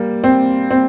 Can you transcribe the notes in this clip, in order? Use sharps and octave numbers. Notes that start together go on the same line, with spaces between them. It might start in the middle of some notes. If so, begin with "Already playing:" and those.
Already playing: G3 A#3
C4
C4